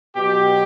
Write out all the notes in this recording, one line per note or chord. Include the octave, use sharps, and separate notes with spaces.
B2 F#3 G4